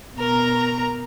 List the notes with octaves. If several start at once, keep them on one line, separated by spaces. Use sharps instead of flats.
B2 A#4 A#5